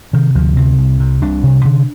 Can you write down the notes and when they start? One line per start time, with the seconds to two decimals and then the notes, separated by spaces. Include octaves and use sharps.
0.13 C3 D#3
0.35 D2 F3
0.56 C3 C4
0.78 C2
1.00 C3
1.22 C2 D4
1.43 C3
1.65 D3